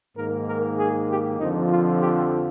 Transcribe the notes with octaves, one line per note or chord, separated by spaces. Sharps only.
G#2 D#3 A#3 A#4
A#4
G#4
G4
F2 D3 F3 D#4
F4
G4